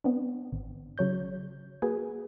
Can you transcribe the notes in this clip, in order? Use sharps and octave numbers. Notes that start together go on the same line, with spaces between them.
B3 C4 D4
G#1
C#3 F#3 C#5 G6
A#3 F#4 G#4 B4 G#5